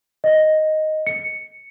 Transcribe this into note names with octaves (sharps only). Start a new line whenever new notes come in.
D#5
C#7